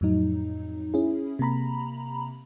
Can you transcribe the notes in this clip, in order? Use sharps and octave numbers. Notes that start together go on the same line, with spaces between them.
F2 A2 F#3 D#4
C#4 E4 G#4
C3 A#3 A#5 B5